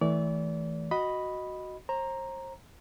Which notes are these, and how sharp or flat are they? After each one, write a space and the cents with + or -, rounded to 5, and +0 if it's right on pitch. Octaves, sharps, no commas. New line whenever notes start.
E3 -25 A3 +0 D5 -30
F#4 +0 D#5 +0 B5 +0
C5 +35 A#5 +0